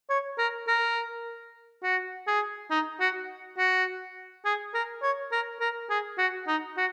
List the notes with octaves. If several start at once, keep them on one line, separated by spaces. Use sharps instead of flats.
C#5
A#4
A#4
F#4
G#4
D#4
F#4
F#4
G#4
A#4
C#5
A#4
A#4
G#4
F#4
D#4
F#4